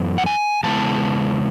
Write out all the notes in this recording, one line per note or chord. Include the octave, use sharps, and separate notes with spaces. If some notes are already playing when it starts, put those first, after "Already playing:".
Already playing: F#2 E3 B3 E4
F#5
G#5
E2 C#3 G#3 B3 E4 A5